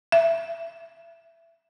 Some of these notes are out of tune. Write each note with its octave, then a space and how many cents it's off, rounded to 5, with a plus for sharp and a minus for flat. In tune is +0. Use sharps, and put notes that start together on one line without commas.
E5 +20